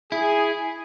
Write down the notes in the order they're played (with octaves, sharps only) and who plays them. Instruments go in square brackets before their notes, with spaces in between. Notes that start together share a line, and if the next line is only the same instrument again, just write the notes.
[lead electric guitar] E4 [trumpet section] G#4